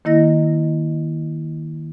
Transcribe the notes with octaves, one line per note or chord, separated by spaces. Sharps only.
D#3 A#3 E4 D#5 A#6